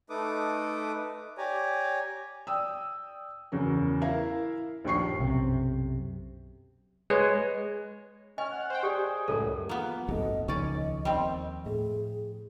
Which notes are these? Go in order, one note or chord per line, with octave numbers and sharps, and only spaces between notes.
A3 D#4 A4 B4 D6 D#6
G4 C#5 D5 G#5 A#5
D5 G5 D#6 E6
E2 C#3 F#3 A#4
E4 A#4 E5 F5
A#1 D#2 C#6 C7
B1 F#2 C3
G#3 B4 C#5
C#4 D#5 G#5 F6
F#5
C5 G5
G4 G#4 D5
C#2 F#2 A2 A4 A#4
F#3 A#3 B3 F4
A#1 F2 G#2 C4 F#4 A4 D#5
D#1 C#2 D#3 F3 C#4 D5 D#5 C#6
D#2 G3 C4
A2 G#4